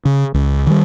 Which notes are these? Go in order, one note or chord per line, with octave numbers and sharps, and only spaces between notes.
C#3
C#2
D#3 G3